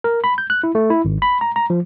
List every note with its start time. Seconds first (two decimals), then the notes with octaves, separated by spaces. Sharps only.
0.04 A#4
0.24 B5
0.38 G6
0.50 F#6
0.64 E4
0.75 A3
0.90 E4
1.05 G#1
1.22 B5
1.41 A#5
1.56 A#5
1.70 F3